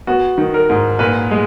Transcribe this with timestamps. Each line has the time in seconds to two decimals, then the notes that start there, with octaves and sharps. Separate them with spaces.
0.07 B3 F#4
0.38 D#3
0.54 A#4
0.69 G#2
0.99 A#2 B4
1.31 G#3